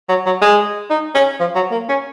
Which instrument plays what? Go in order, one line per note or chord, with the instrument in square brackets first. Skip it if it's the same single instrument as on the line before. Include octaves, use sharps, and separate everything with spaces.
[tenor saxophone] F#3
F#3
G#3
D#4
C#4
F3
F#3
A#3
C#4